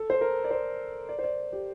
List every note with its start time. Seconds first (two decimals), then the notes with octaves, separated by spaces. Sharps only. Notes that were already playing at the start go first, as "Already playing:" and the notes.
Already playing: A4
0.10 C5
0.21 A#4
0.44 D5
0.51 C5
1.09 D5
1.19 C5
1.24 D5
1.52 G4